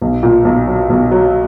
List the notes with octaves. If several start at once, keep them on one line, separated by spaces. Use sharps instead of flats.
B1
A#2
B1
F#3
B1
F#3